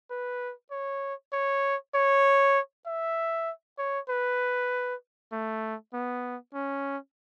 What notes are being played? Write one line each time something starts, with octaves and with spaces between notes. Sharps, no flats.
B4
C#5
C#5
C#5
E5
C#5
B4
A3
B3
C#4